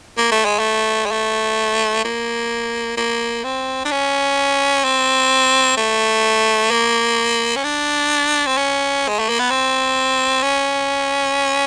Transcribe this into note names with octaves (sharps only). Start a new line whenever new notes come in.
A#3
A3
G#3
A3
G#3
A3
A#3
A#3
C4
D4
C#4
C4
A3
A#3
C#4
D4
C4
C#4
G#3
A3
A#3
B3
C4
C#4